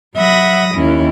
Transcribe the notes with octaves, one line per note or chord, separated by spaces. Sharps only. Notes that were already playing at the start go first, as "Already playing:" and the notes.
F#3 E5 F#5 B5 D#6 A#6
D#2 C#4 E4